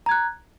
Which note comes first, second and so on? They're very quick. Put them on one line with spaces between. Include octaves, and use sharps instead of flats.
A#5 G#6 F#6